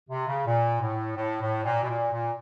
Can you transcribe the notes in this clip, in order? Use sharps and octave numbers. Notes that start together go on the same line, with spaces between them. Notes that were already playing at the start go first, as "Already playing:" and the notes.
C3
C#3
A#2
A2
A2
A2
A#2
B2
A#2
A#2